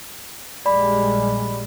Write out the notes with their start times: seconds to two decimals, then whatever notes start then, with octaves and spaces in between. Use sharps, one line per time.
0.66 A#1 G3 G#3 D5 B5